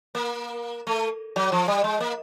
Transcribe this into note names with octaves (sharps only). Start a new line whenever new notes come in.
A#3
A3
F#3
F3
G3
G#3
A#3